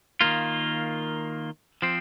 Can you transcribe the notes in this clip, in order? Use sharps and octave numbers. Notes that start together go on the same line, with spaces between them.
D#3 A#3 F4
F3 C4